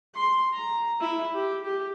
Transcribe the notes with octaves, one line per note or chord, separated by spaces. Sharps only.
C6
A#5
E4
G4
G4